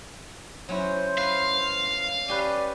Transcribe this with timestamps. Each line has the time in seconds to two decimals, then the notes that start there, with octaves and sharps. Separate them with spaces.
0.69 F#3 C#4 E4 C5
1.18 B4 F5
2.28 C#4 G4 B4 D5